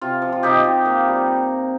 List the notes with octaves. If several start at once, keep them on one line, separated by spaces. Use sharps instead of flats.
C3 F4
F3
F4
C3 D#4 G4
C3
A#3
G3